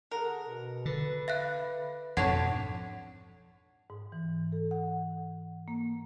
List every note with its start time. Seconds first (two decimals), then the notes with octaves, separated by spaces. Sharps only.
0.11 D3 G#4 A#4 F#5
0.47 B2
0.85 D3 B4
1.28 E5 F5 F#6
2.17 F2 G#2 B2 D3 C#5 F#5 A5 G#6
3.90 G#2
4.12 E3
4.52 A4
4.71 F#5
5.68 A#3